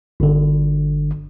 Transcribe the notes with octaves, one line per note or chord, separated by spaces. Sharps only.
G1 D3